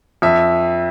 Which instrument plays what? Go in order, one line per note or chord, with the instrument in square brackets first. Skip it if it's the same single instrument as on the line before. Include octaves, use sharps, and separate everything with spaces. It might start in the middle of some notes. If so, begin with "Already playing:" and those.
[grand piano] F2 E5